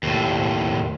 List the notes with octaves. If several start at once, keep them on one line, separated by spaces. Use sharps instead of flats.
D#2 A2